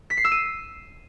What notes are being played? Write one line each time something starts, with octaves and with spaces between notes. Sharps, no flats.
B6
C7
E6
D#7